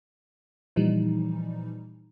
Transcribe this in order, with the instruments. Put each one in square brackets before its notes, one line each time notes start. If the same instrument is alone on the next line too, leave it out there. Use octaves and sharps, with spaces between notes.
[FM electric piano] A#2 E3 F3 G3 D#4